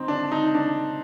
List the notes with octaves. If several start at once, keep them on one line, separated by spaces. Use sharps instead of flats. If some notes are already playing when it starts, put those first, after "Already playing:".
Already playing: C4 D#4
D4
D#4
D4